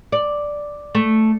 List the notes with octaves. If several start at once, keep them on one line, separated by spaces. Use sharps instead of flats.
D5
A3